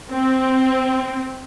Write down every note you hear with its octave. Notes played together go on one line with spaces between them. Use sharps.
C4